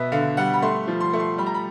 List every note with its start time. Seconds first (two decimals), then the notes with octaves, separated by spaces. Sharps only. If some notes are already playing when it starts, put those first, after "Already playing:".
Already playing: B2 B3 E5
0.12 D3 F5
0.37 G3 F#5
0.53 B5
0.62 A3 C6
0.88 F3
1.00 C6
1.13 A3
1.20 C6
1.38 G3 B5
1.46 A#5
1.54 B5